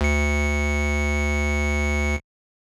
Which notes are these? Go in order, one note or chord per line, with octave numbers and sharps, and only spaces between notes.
D2 C#7